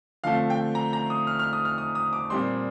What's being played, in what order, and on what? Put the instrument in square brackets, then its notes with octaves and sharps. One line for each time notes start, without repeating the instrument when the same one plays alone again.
[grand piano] D3 F3 A3 C4 F5
G5
A#5
A#5
D#6
F6
F6
D#6
F6
D#6
D#6
D6
A#2 G3 C4 C6